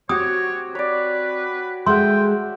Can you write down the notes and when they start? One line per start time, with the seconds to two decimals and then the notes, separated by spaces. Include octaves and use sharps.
0.09 C4 F#4 G4 C#5 D#6
0.75 B4 C#5 D5
1.86 G#3 A4 E5 F#5 G5 C6